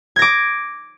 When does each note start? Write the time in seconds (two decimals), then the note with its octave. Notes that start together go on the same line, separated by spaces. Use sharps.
0.16 G#6
0.19 A#6
0.22 D6